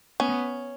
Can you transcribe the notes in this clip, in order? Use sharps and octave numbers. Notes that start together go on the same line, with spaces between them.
B3 C#4